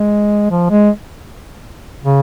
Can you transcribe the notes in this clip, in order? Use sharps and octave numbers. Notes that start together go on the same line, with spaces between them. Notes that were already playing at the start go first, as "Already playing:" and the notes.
Already playing: G#3
F3
G#3
C#3